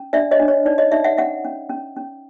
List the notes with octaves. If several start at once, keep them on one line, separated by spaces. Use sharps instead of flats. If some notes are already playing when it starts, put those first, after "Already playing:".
Already playing: C#4
D4 D5 E5
C#5 D#5
D4
C#5
D#4 D5
C#5 D#5
D#4 D5 E5
E5 F#5
C#4 E5 F#5
C#4
C#4
C#4